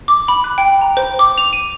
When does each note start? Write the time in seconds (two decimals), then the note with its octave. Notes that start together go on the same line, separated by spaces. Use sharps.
0.08 D6
0.28 B5
0.44 F#6
0.58 G5
0.81 A#5
0.97 C5
1.19 D6
1.38 F7
1.53 D#7